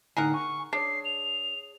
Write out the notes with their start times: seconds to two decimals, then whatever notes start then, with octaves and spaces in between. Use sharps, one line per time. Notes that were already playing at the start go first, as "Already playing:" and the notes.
0.17 A2 D3 D#4 G#4 A#4 F#5
0.34 G#5 C#6
0.73 D4 G#4 C#5 C7
1.05 F7